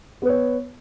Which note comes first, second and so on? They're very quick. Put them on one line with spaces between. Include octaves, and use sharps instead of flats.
B3 B4 C#5